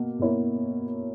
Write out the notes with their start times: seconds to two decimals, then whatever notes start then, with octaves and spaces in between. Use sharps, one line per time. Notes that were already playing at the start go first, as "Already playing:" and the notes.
Already playing: B2 A#3
0.19 B2 A#3 E4 A#4 C#5